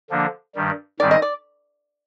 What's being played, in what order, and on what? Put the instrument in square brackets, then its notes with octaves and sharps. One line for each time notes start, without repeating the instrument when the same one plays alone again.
[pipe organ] D3 F3 A#3 D4
G2 D#3 G3
[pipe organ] G#2 D#3 G3 C4 [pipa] D5
[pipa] D#5
D5